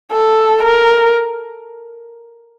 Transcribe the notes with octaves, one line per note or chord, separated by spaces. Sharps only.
A4
A#4